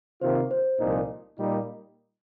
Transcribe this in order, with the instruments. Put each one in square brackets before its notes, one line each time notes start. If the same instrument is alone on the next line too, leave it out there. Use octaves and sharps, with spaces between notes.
[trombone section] C3 D#3 A#3 F4 [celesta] C5
[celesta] C5
[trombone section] C2 A#2 F3 D#4
A#2 G3 A#3 D#4